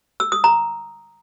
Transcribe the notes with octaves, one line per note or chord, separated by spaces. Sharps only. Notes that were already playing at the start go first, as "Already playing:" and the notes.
E6
D#6
A#5